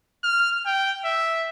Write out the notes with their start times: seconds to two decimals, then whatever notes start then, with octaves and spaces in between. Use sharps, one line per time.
0.24 F6
0.66 G5
1.05 E5